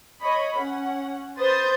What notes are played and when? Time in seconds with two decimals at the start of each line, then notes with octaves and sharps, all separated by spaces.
0.21 C#5 D#5 B5
0.59 C#4 F#5
1.39 B4 C5 D#6 G6 A6